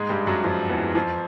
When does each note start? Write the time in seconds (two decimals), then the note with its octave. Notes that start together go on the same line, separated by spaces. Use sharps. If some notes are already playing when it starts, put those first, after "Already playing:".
Already playing: G#2 G#3
0.09 G2 G3
0.27 F#2 F#3
0.44 F2 F3
0.69 E2 E3
0.95 F2 F3